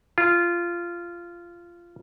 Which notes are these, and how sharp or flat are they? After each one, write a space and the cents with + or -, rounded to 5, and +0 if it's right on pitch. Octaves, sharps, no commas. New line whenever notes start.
F4 -15